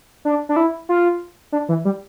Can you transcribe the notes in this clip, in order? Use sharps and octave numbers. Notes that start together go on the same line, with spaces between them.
D4
D4
E4
F4
D4
E3
G3